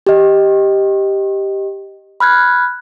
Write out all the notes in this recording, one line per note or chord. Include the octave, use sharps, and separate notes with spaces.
G4 D#5
B5 F6 F#6 G#6